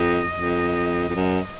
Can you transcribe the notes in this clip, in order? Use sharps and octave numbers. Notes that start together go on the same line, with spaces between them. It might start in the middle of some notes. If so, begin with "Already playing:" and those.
Already playing: F2 D#5
F2
F2
F#2